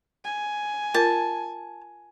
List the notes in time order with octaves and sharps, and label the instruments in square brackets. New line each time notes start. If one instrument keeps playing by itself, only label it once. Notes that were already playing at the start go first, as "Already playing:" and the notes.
[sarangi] G#5
[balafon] F4 A#4 [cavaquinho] A5